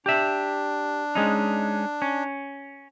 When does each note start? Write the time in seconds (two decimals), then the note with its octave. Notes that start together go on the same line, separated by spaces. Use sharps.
0.06 D4 G4 E5
1.15 G#3 C#4 D#4
2.02 C#4